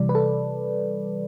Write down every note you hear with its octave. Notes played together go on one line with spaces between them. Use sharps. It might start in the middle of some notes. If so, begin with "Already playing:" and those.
Already playing: C3 E3 G3 D5
B4
A4